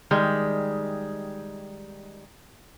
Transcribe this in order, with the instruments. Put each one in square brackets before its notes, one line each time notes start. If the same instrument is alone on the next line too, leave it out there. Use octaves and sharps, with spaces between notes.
[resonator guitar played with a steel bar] D#3 G3 G#3